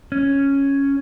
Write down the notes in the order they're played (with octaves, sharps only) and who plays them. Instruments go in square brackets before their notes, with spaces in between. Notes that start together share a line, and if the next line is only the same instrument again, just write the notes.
[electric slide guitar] C#4